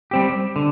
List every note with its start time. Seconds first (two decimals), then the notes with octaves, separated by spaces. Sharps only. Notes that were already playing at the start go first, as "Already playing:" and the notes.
0.11 G3 C4 G4
0.56 D3